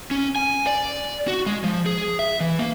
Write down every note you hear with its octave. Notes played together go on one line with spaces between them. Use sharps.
C#4
G#5
D5
F#4
G#3
F3
G#4
E5
E3
A#3